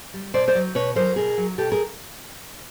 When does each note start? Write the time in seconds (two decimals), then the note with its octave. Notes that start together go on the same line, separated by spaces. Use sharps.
0.14 G3
0.34 B2 C5 D5
0.48 C5 D5
0.55 F#3
0.75 B2 B4 C#5
0.95 F#3 A#4 C5
1.16 B2 G#4 A#4
1.37 F#3
1.58 B2 G4 A4
1.72 G#4 A#4